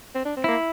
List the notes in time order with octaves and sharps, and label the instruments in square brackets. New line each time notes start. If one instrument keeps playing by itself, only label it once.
[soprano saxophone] C4
D4
C4
[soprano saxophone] A#3 [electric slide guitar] E4